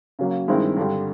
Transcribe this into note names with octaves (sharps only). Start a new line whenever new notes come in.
C#3 F#3 A#3
G2 D#3 G#3 C4 E4
G2 D3 G3